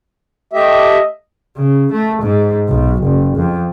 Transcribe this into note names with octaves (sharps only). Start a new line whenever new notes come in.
A3 G4 D#5 E5
C#3
A3
G#2
B1
F#1
F2